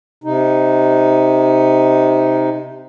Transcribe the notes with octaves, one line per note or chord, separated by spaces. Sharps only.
C3 D#4